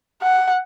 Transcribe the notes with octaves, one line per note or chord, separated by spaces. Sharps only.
F#5